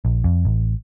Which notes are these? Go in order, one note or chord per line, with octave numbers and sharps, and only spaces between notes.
A#1
F2
A1